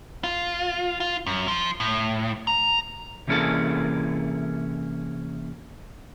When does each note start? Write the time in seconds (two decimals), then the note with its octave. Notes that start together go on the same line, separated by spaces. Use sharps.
0.24 F4
1.00 F4
1.27 F#2
1.48 F3
1.80 A2
2.47 A#5
3.28 C3 E3 A#3 C#4 G#4 A4